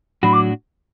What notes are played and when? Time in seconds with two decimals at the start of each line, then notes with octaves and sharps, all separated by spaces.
0.23 A2 F#3 D4 F#4 B5
0.33 D6